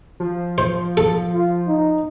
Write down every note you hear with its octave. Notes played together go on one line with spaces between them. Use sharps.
F3
C5
A4
F4
D#4